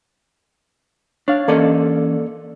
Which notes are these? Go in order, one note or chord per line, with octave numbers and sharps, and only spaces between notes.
D4 C#5 F5
E3 A#3 C#4 A4 D5 D#5